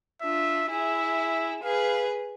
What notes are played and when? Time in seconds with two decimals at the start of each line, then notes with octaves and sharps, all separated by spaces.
0.22 D4 F4 E5
0.68 E4 G#4 E5
1.62 G#4 B4 F5